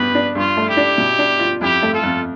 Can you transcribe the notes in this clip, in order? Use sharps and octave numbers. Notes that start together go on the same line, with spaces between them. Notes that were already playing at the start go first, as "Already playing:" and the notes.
Already playing: G2 B3 G4 B4
D4
G2 F4
A3
E4 G4
D4
B2
D4
F4
F2 E4 G4
A3
F4 A4
F2